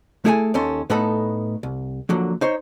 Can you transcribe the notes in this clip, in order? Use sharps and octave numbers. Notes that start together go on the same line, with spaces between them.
A3 E4 G#4 A4 F5 G#5
D#2 D#3 C#4 A4 C6
A2 A3 B3 D#4 A4 B5
C2
D3 F3 F#3 A#3
D#4 C5 C#5